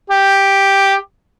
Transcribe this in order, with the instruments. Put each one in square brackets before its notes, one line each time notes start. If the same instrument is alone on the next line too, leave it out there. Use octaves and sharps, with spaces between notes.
[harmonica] G4